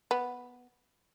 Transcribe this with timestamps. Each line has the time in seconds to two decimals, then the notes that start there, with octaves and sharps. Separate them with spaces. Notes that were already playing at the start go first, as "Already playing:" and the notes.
0.11 B3